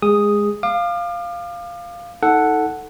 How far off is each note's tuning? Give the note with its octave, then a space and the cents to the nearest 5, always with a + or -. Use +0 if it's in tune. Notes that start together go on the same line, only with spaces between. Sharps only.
G#3 +0 G#4 -20 D#6 +0
F5 -5 D6 +40
D#4 +30 A4 +0 F#5 +0